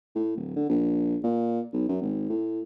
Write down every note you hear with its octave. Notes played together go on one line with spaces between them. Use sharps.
A2
D1
D3
A#1
A#2
B1
F#2
G#1
A2